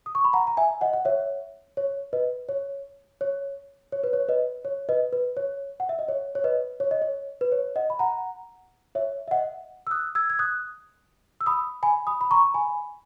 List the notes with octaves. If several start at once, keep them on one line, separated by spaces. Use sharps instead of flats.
D#6
C#6
B5
F#5 A#5
A#5
E5 G#5
D#5 F#5
F#5
C#5 E5
C#5
B4 D#5
C#5
C#5
C#5
B4
C#5
B4 D#5
C#5
B4 D#5
B4
C#5
F#5
E5
D#5
C#5
C#5
B4 D#5
C#5
D#5
C#5
B4
C#5
D#5 F#5
B5
F#5 A#5
C#5 E5
E5
D#5 F#5
E6
D#6 F#6
E6 G#6
G#6
D#6 F#6
E6
B5 D#6
G#5 B5
B5 D#6
B5
A#5 C#6
G#5 B5